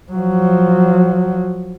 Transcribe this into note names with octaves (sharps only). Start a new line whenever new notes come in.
F3 F#3